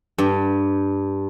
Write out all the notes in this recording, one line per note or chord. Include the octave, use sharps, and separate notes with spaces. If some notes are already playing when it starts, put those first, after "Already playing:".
G2